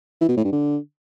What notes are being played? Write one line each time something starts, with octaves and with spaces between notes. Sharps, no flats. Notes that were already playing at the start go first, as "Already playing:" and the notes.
E3
B2
A2
G2
D3